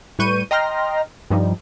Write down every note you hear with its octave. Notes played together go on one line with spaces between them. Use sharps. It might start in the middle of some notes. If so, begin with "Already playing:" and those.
A2 G3 B4 C#6 G6 D#7
D#5 G5 A#5 C6 F6 A#6
G2 F3 G3 D#4